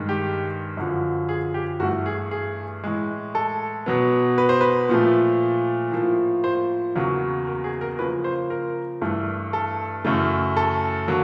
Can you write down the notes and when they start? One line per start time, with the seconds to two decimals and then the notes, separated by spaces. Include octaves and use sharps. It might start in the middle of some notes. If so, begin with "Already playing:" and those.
Already playing: G2 D#3 G#3
0.09 G4
0.77 F#2 D3 F3
1.29 G#4
1.54 G4
1.80 G2 E3 A3 F#4
2.06 G#4
2.31 G#4
2.84 A2 E3 G#3
3.35 A4
3.86 B2 F#3 B3
4.38 B4
4.49 C5
4.61 B4
4.89 A#2 F3 A3
5.92 A2 F3 A#3
6.44 C5
6.96 E2 C#3 F#3 A#3
7.47 A#4
7.64 G#4
7.81 A#4
7.99 C#3 F3 A#3 B4
8.24 C5
8.50 A#4
9.02 G2 E3 A3
9.53 A4
10.05 F#2 C#3 E3 A3
10.57 A4
11.08 D3 F#3 A#3